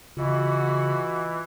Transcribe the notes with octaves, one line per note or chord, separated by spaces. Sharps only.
C#3 E3 F4 F#4 D#5